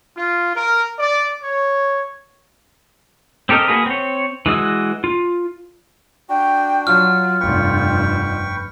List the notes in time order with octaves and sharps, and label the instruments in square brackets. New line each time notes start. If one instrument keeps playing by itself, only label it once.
[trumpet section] F4
A#4
D5
C#5
[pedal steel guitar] C4 G4 A4 A#4 D#5
A#3 F#4 G#4 B4
C4 C#5
E3 G#3 F#4 E6
F4
[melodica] D4 F#4 [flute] G5
[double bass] F#3 [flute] F4 [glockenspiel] F6
[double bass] F1 G2 [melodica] B4 G5 C#6